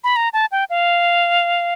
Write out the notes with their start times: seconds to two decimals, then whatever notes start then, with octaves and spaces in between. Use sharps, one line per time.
0.04 B5
0.16 A#5
0.33 A5
0.52 G5
0.70 F5